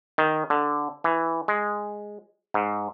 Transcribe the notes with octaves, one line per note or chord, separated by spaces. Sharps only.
D#3
D3
E3
G#3
G#2